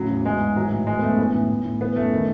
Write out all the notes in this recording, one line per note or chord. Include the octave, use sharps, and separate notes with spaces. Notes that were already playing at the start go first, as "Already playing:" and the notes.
Already playing: A2 C#3 F#3
E2
E3 G#3
G#2
E3 F#3
A2
E3 G#3
B3
F#2 A3
E3 B3
A2
E3
A2
E3 B3
F#2 A3
D#3